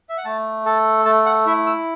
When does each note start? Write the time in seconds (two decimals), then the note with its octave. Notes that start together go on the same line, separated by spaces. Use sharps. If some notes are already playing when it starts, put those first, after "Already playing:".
0.09 E5
0.18 F#5
0.25 A3 A5
0.65 A4 A5
1.05 A3 A5
1.26 F#5
1.46 E4 E5
1.66 E6